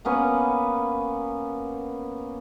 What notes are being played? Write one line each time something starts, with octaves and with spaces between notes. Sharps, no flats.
A#3 B3 C#4 B4